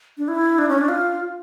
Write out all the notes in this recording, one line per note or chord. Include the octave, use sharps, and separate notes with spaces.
D4
E4
D4
C#4
D4
F4